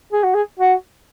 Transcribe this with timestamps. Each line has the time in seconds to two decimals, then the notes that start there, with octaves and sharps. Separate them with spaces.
0.13 G#4
0.24 F#4
0.35 G#4
0.60 F#4